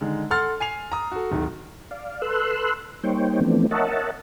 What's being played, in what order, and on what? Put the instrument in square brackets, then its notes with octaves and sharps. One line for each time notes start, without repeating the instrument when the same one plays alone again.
[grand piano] D3 D#3 G#3
A4 F#5 C6 F6 A6
G#5 C7 F7
A#5 D#6
F#4 A4
D1 D#3 A3
[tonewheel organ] D5 F5
A4 B4 C6 E6 F#6
G3 A#3 D#4 C5 C#5 G5
E3 F3 A3 B3 C4 D4
A#4 C#5 D#5 E5 F#5 A5